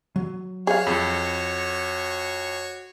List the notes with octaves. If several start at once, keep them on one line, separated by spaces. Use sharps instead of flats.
F#3
F#4 G#4 C#5 F5
F2 A4 B5